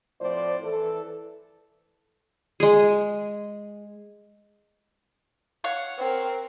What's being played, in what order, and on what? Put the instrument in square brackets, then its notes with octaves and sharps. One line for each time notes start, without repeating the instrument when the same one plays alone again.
[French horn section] A2 F3 C4 C5 D5
E3 A4
[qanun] G#3 G#4
[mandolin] C#5 F5 F#5
[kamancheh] C4 A#4